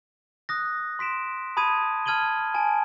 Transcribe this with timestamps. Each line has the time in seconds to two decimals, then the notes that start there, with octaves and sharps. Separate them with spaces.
0.49 D#6 F#6 A#6
0.99 C6 B6 D7 E7
1.57 A5 B5 D#6 G#6 D#7
2.06 A5 F6 G#6 D#7 F#7 G7
2.54 G#5 A5 D7